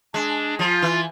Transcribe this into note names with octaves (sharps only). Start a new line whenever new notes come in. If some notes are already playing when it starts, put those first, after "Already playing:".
G#3 D4
F3 F4
E3